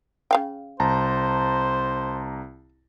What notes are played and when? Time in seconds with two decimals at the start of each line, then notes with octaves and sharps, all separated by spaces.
0.31 C#3 F5 G5
0.80 C2 C5 A5 A#5